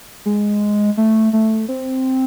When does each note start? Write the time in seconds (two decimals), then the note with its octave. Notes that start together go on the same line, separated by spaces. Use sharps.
0.26 G#3
0.97 A3
1.33 A3
1.69 C4